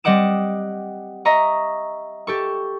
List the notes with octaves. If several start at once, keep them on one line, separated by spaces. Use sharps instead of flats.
G3 C4 D#5 F#5 D6 E7
D#5 E5 A#5 C#6
G4 A4 C#6